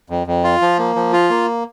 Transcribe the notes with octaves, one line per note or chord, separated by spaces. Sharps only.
F2
F2
F4
F3
A#3
F3
F4
A#3